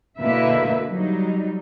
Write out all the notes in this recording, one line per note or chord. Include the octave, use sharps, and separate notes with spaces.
B2 D3 A#3 E4 B4 E5
F#3 G3 D#4